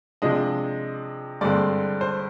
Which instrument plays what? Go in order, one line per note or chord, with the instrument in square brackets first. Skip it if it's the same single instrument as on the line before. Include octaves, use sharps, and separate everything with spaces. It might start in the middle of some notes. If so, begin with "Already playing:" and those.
[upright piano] C3 F3 G#3 D4 D#5
G2 D3 G#3 C4 D5
C5